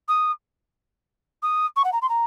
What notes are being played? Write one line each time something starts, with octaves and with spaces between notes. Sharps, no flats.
D#6
D#6
C#6
F#5
A#5
C6
A#5